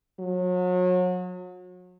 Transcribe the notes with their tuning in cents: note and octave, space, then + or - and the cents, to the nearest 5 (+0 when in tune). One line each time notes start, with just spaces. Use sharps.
F#3 -35